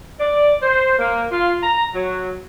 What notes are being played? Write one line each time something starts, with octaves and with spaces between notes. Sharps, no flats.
D5
C5
A#3
F4
A#5
F#3